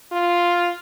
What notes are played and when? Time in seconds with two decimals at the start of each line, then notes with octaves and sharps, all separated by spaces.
0.12 F4